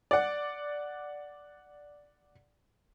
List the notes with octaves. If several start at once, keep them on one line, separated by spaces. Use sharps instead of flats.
D5 F#5